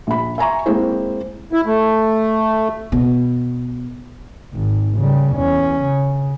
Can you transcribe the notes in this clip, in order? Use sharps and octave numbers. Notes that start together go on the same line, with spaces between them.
A#1 B5
E5 G#5 A#5 C6 C#6
G#3 A#3 C4 E4 G#4 C5
E4
A3
B2
G#1
C#3 G3
E2 C#4
C#3